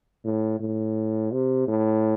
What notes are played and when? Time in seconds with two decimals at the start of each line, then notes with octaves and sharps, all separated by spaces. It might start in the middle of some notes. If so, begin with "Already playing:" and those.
0.25 A2
0.60 A2
1.32 C3
1.68 A2